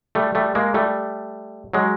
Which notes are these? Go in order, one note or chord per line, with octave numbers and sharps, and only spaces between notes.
G3 A3
G3 A3
G#3 A#3
G3 A3
F#3 G#3